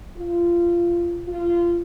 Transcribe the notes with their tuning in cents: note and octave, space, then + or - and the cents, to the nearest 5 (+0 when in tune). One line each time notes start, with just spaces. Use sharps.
F4 -20
F4 -20